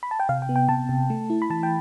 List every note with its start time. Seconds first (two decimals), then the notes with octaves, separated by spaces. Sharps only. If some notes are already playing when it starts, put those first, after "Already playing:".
0.03 B5
0.11 A5
0.20 G5
0.29 C3 F5
0.42 G5
0.49 B3
0.56 G5
0.69 C3 A5
0.89 C3
1.10 A3
1.30 E4
1.42 B5
1.50 E3 A5
1.63 G5